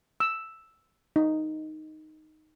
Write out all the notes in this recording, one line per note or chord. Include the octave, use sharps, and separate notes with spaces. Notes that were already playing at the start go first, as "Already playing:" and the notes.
E6
D#4